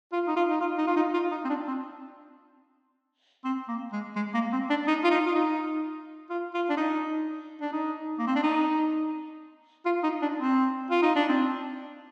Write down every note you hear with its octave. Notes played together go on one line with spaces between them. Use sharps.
F4
D#4
F4
D#4
F4
D#4
F4
D#4
F4
D#4
C4
D4
C4
C4
A#3
G#3
G#3
A#3
C4
D4
D#4
F4
D#4
F4
D#4
F4
F4
D4
D#4
D4
D#4
A#3
C4
D4
D#4
F4
D#4
D4
C4
F4
D#4
D4
C4